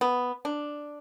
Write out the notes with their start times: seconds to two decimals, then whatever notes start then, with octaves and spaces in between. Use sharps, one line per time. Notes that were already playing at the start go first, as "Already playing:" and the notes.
0.01 B3
0.45 D4